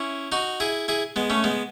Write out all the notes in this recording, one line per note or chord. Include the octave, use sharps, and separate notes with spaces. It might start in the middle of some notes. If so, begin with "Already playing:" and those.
Already playing: C#4 E4
D#4 F#4
E4 G#4
E4 G#4
G#3 B3
A3 C#4
G#3 B3